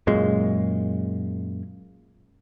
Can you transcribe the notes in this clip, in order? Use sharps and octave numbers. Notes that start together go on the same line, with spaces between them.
F#2 A#2 G#3